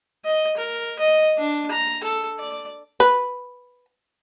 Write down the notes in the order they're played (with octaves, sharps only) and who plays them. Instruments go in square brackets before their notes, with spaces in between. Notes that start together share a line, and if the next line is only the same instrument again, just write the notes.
[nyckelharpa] D#5
A#4
D#5
D4
A#5
A4
D5
[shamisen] B4